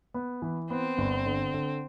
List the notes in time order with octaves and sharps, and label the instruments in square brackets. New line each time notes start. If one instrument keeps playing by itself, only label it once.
[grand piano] B3
E3
[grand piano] B3 [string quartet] C4
[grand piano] G1
D3
D3